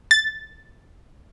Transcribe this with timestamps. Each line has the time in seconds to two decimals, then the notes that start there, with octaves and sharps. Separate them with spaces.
0.11 A6